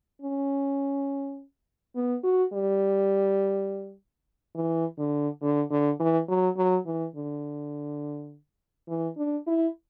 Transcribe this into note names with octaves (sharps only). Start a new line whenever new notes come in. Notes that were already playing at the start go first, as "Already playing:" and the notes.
C#4
B3
F#4
G3
E3
D3
D3
D3
E3
F#3
F#3
E3
D3
E3
D4
E4